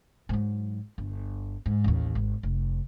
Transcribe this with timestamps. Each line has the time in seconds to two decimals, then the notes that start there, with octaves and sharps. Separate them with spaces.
0.29 G#2 F#3
0.98 G1
1.66 G#2
1.84 A1 D#2
2.15 G#1
2.43 F1